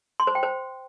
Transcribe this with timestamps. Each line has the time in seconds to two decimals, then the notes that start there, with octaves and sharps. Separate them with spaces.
0.20 C6
0.27 C5
0.35 G5
0.43 C5